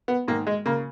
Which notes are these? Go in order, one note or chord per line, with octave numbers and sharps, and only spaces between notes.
B3
G#2 D#3 A#3
G#3
C#3 A#3